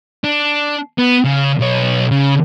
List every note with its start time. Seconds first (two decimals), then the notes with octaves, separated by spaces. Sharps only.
0.24 D4
0.98 B3
1.24 C#3
1.60 B1 C#5
2.11 C#3